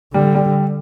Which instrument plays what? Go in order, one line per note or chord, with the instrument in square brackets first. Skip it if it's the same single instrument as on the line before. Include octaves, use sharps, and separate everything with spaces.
[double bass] D3 [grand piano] G3
[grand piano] G3